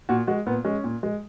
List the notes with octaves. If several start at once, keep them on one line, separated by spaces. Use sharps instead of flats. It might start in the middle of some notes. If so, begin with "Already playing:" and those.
A#2 F#4
G#3 F#4
A#2 B3
G#3 C#4
A#2
G#3